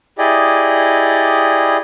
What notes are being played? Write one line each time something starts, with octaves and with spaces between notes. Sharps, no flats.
E4 G4 G#4 D5 D#5